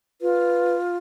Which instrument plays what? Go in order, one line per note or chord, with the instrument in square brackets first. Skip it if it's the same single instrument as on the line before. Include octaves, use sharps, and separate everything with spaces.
[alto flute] F4 [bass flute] B4